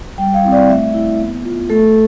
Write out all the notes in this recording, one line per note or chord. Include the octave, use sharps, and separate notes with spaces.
G3 G5
F5
C4 E4
D5
A3 E5
E4
B3
F4
A3 A4